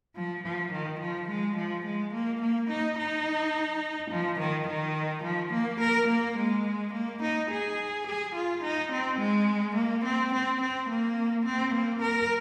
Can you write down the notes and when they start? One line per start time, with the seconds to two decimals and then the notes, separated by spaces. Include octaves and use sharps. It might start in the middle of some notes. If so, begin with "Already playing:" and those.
0.15 F3
0.44 F3
0.72 D#3
1.00 F3
1.29 G#3
1.57 F3
1.85 G#3
2.14 A#3
2.42 A#3
2.70 D#4
2.99 D#4
4.11 F3
4.40 D#3
4.67 D#3
5.24 F3
5.53 A#3
5.80 A#4
6.09 A#3
6.37 G#3
6.93 A#3
7.22 D#4
7.51 G#4
8.07 G#4
8.35 F4
8.64 D#4
8.92 C4
9.19 G#3
9.76 A#3
10.05 C4
10.33 C4
10.61 C4
10.89 A#3
11.45 C4
11.74 A#3
12.02 A#4